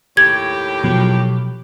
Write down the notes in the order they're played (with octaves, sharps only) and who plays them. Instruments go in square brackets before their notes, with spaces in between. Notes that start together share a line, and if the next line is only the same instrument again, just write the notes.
[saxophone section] D#2 A2 G4 [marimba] G#6
[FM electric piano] B2 F3 F#3